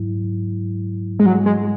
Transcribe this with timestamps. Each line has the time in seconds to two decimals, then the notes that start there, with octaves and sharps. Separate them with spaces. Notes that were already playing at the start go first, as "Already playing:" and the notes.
Already playing: G#2 F#3 E4
1.19 G#3
1.26 F#3
1.46 G#3